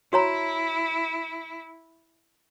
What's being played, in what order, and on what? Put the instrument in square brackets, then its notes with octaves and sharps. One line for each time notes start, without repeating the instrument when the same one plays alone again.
[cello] E4 [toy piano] F#4 C#5 A#5